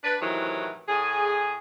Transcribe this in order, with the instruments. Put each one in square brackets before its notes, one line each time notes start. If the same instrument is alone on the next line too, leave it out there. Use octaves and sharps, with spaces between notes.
[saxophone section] D4 B4
A2 C3 D#3 E3 F#3
A2 G#4